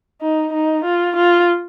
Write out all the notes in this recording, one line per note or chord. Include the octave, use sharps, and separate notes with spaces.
D#4
D#4
F4
F4